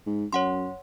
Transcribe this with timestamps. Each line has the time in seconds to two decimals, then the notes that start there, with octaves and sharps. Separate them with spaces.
0.07 G#2
0.33 F#2 C#5 F#5 C6